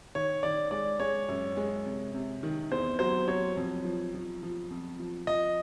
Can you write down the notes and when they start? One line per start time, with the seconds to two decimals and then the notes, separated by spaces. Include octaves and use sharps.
0.15 D#3 C#5
0.43 D#3 D5
0.71 G#3 D5
1.00 G#3 C#5
1.28 F#2
1.57 G#3
1.85 C3
2.14 C3
2.43 D#3
2.71 E2 C5
2.99 F#3 C5
3.28 F#3 C#5
3.57 F2
3.84 F3
4.14 F3
4.43 F3
4.71 F2
5.00 F3
5.27 F3 D#5